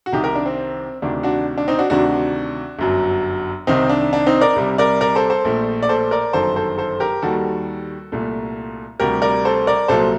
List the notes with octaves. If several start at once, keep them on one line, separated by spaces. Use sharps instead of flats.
F#4
C2 C3 D#3 D#4 G4
G4 A#4
D4
C4
D2 C3 D#3 D4
D4 F#4
D4
C4 D#4
D4 F#4
D2 C3 D#3 D4 F#4
G1 F#2 F#3
C2 C3 D#3 C4 D#4
D4
D4
C4 D#4
A#4 D5
C2 C3 G3
A#4 D5
A#4 D5
A4 C5
A4 C5
A#1 A#2 A3
D5
A4 C5
A#4 D5
G1 F#2 D#3 A4 C5
A4 C5
A4 C5
G4 A#4
D#2 D#3 G3 F#4 A4
C2 A#2 A3
D2 C3 G3 G4 A#4
A#4 D5
A4 C5
A#4 D5
C2 A#2 F#3 A4 C5